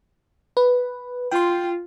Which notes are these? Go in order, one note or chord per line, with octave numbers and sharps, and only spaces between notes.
B4
F4 G5 C6